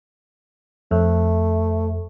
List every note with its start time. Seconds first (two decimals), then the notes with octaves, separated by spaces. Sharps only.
0.91 F2 A3